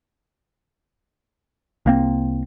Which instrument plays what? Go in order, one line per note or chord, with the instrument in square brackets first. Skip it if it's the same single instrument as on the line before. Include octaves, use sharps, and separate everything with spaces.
[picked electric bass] C2 A#3 C4